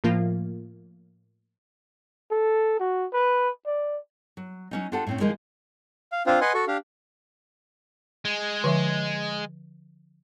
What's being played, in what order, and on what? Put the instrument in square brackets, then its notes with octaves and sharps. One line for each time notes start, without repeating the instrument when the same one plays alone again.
[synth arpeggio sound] A2 F3 A#3 F4
[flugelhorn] A4
F#4
B4
D5
[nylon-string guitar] F#3
F#3 C#4 D#4
D4 F4 G4 A4 F#5 A5
A2 C4 C#4
D#3 F3 G#3 A#3 D#4
[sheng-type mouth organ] F5
C4 D4 F4 C5 F5
B4 D#5 F#5 G#5 C6
F#4 A4 C#6
D4 G4 F5
[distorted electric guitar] G#3
[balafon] D3 F3 E5